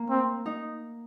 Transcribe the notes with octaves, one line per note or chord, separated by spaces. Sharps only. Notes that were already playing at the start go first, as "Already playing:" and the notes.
Already playing: A#3
C4
D#4